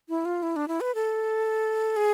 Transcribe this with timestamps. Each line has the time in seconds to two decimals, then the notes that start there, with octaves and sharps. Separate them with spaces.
0.09 E4
0.25 F4
0.43 E4
0.56 D4
0.68 E4
0.81 B4
0.95 A4
1.97 G#4